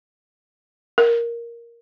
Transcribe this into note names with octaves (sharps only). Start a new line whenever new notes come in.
A#4